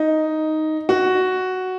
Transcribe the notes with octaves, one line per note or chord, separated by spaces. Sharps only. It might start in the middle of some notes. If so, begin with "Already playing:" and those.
Already playing: D#4
F#4